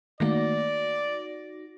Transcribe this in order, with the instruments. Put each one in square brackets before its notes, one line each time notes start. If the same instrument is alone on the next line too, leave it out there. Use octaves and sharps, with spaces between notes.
[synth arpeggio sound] D#3 A3 A#3 [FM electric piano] D#4 F#4 A#6 [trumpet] D5